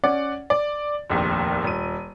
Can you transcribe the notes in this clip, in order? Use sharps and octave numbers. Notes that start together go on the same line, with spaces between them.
C#4 D5 F#5
D5
F1 A#1 D#2
D#1 D#7